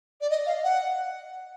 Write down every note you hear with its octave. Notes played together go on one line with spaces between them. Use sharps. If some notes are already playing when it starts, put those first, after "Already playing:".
D5
D#5
F5
F#5